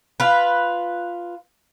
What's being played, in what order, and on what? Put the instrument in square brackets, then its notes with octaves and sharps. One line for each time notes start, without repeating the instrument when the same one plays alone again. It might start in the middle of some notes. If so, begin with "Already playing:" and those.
[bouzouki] F4 B4